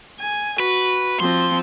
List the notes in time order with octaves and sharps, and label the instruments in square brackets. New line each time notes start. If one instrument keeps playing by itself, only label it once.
[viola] G#5
[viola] F#4 [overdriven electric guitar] B4
[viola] F3 C4 [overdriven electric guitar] C6